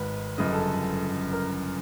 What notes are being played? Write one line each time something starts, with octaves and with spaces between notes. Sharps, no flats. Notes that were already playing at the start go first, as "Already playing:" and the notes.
Already playing: G#1 G#2 B4
G1 F#2 C#3 D#5
A4
A#4